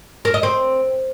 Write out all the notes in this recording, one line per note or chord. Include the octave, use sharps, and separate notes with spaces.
A#4
D#5
C4